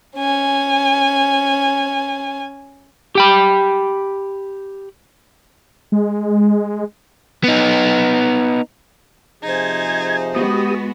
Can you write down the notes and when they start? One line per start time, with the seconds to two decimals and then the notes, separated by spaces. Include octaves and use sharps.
0.16 C#4 G#5
3.15 G4 G5 B5
5.92 G#3
7.44 B3 D#4
9.43 C3 F3 D#4 G#4 C5 G#6
10.35 G#3 B3 F#4 G4 D#6